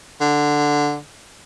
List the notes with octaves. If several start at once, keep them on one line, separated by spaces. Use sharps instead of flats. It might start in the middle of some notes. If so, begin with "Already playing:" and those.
D3